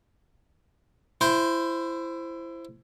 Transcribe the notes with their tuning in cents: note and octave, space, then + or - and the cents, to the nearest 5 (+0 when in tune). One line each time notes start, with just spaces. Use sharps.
E4 +20 C5 +0